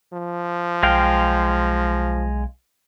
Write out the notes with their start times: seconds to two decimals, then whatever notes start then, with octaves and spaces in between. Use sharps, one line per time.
0.13 F3
0.83 B1 G#3 F5 G5